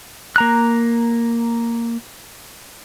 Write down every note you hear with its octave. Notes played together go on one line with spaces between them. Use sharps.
A#3 A#5 F#6